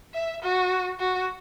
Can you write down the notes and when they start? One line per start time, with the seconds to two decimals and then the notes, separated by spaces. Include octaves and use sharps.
0.14 E5
0.42 F#4
0.99 F#4